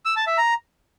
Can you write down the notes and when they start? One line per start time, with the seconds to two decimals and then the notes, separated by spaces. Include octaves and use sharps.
0.05 E6
0.16 A5
0.27 E5
0.38 A#5